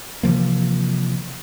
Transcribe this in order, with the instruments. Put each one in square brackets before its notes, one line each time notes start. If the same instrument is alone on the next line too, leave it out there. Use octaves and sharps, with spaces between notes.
[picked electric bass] C3 E3 F3 A#3